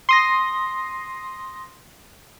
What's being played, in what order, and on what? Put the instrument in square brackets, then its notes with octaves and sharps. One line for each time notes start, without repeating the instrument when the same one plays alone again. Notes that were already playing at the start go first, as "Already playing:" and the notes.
[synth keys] C6 D#6 A#6